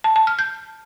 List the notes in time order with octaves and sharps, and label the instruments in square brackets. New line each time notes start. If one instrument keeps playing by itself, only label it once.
[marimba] A5
A5
F6
G6